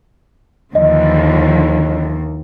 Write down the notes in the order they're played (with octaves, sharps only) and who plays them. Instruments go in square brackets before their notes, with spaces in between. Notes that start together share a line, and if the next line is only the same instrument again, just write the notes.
[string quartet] D#2 [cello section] D3 E3 F3 [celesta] D#5